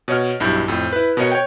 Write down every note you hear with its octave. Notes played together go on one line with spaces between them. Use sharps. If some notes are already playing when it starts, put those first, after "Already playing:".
B2 C#5 D#5 F6
B1 G2 E4 G6
F2 A2
E4 B4
B2 B3 A#4 C#5 D#5 C#7
C#5 G5